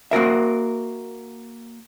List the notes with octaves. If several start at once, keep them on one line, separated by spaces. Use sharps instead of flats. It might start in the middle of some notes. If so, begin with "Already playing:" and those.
A#3 F#4 A#4 E5